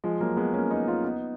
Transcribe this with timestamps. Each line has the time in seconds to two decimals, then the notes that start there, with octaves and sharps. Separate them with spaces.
0.04 F3 G#3
0.21 F#3 A#3
0.37 G#3 B3
0.54 A#3 C#4
0.71 B3 D#4
0.87 C#4 F4
1.04 B3 D#4